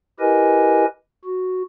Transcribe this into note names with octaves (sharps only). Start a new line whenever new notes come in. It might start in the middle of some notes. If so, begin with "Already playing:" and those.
E4 G4 A#4 B4 D#5 G#5
F#4